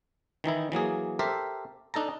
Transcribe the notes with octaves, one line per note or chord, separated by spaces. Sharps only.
D#3 E3 D#4 E4
E3 F#3 A#3 G#4
G4 A4 A#4 C5 E5
D4 D#4 A4 A5 A#5